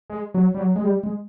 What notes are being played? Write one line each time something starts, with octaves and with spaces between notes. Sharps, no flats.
G#3
F#3
G3
F#3
G#3
G3
G#3